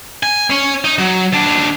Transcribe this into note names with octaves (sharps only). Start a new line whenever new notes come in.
G#5
C#4 C#5
D#4
F#3
D#2 D4